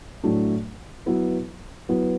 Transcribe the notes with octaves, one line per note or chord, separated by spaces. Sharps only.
A2 F#3 A3 D4
F#3 B3 E4 B4
F#3 B3 E4 B4